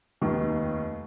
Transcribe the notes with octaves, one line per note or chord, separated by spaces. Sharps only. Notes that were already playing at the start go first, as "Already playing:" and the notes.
F1 D#2 D#3